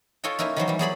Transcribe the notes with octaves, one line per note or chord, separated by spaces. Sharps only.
F4 A4 C#5 D#5 G5
A#3 C#4 D#4 E4 A#4
D#3 E3 F#3 C5
E3 G3
F#3 G#4 D5 B5